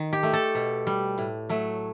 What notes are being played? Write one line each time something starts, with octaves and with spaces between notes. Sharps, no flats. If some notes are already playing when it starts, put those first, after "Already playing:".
Already playing: D#3
G4
A3
A4
B2
G3
A2
F#3 A3